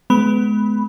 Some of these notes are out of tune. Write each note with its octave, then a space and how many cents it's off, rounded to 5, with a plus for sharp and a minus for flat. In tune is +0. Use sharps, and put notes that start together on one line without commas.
G#3 +35 B3 +15 B5 +0